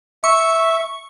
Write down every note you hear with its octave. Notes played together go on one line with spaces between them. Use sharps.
E5 C#6